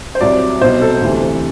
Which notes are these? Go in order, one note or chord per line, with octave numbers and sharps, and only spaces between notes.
C5
C2 C3 F#3 D5
C2 B2 F#3 C5
A4
D2 C3 E3